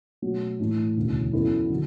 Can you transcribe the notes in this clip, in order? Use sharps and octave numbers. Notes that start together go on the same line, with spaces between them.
B2 F#3 A3 C#4 F#4
A2 E3 A3 E4
E1 D2 C#3 E3
F#2 E3 B3 E4 A4
D3 F#3